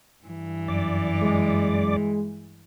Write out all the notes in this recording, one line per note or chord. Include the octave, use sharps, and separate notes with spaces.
G2 E3
F#2 D5 D6
G#3